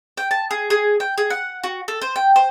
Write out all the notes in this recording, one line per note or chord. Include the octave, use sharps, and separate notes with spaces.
G5
A5
G#4
G#4
G5
G#4
F#5
F#4
A4
C5
G5
C5